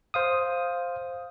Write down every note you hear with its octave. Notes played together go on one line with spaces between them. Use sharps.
C5 F5 D#6